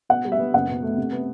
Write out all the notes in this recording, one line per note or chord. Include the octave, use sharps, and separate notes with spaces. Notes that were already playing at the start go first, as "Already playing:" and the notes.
B2 F#5
G3
E5
B3
F#1 F#5
B2
A3
C3
B3